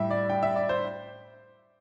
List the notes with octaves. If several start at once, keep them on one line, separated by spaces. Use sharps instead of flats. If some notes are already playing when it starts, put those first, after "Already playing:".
Already playing: A2 G3 E5 G5
D5
G5
E5
D5
C5